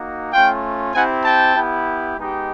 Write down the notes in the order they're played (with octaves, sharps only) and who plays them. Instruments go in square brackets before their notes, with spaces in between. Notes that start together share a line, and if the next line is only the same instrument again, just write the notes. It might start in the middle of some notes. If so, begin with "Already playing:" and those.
Already playing: [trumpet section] A#3 D#4 F#4
A3 C#4 F4 F5 G5
C4 E4 G4 F#5 G#5
G5 A5
B3 E4 G4
G#3 B3 D#4 G4